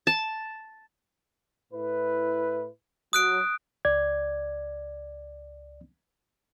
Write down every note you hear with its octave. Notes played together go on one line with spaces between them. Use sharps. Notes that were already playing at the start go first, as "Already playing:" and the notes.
A5
A2 E4 B4
F#3 D#6 F#6 D7
C#2 D5 G#6